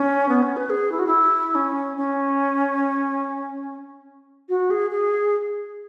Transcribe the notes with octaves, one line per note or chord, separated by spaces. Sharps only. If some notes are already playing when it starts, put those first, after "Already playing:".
Already playing: C#4
B3
C#4
B4
G#4
E4
F#4
E4
C#4
C#4
F#4
G#4
G#4